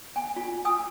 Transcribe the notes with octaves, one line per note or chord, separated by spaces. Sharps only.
G#5
F4
G#5 D#6 E6